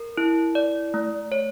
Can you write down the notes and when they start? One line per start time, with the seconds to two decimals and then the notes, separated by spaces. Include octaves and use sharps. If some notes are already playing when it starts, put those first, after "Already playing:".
Already playing: A#4
0.18 E4
0.55 D5
0.94 A3
1.32 C#5